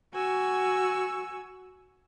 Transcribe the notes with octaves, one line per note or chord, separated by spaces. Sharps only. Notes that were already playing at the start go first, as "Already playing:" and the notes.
F#4 G#5 C#6 E6